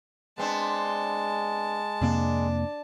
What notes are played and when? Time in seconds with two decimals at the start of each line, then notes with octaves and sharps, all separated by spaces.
0.38 G#3 B3 C4 D4 A5
2.01 F2 C3 A#3 D4